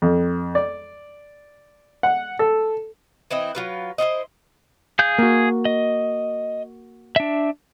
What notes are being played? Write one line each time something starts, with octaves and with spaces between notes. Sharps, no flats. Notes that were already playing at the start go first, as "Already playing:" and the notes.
F2
D5
F#5
A4
E3 C4 E4 D#5
F#3 F4 B4
E4 F4 C5 D#5
G#4 F5 G6
A#3 F#4
D#5
D4 E5